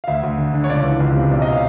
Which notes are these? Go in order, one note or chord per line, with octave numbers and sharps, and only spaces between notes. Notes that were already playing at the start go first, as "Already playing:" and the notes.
F5
D2 E5
D2
D3
D3
C#5
C#2 D5
E3
C#2
C3
B1 D5
D#5
F5